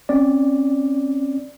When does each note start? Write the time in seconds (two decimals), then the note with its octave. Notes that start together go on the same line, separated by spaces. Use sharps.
0.09 C4 C#4 D5